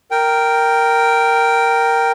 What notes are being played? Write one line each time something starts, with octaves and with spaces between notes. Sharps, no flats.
A#4 G5